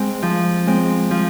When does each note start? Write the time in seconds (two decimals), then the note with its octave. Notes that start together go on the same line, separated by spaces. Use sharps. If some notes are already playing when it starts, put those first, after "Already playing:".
Already playing: G#3 C4
0.22 F3
0.67 G#3 C4
1.11 F3